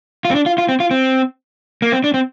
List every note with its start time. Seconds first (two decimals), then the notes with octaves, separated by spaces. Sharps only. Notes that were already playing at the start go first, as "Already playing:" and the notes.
0.25 F4
0.31 C4
0.35 D4
0.46 F4
0.58 F4
0.69 C4
0.80 F4
0.91 C4
1.82 A#3
1.92 C4
2.04 D4
2.14 C4